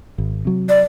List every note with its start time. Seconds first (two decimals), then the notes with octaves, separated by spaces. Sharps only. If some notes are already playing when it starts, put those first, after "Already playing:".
0.18 G#1
0.45 C3 F#3
0.69 D5